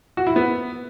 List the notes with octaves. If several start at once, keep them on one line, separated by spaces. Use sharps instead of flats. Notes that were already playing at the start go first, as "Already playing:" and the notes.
F#4
E4
B3